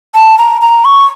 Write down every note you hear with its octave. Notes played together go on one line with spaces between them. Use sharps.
A5
A#5
A#5
C#6